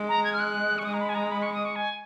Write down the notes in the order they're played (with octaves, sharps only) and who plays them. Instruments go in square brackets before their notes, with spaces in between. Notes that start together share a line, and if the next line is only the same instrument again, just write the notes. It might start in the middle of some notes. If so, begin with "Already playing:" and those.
Already playing: [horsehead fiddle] G#3
[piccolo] A#5
G#6
F6
F#6
C#6
[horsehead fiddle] G#3 [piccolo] D#6
[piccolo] A#5
B5
G#5
A#5
B5
C#6
D#6
C#6
G#5